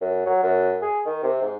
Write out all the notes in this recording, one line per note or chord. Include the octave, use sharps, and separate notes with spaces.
F#2
F#3
F#2
G#4
D#3
C3
G#2